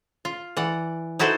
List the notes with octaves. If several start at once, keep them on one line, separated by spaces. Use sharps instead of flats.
F4
E3 D5 F#5
D#4 E4 F#4 A4 B4 C5